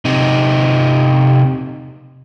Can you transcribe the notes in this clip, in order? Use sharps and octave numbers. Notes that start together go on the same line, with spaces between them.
C3 D#4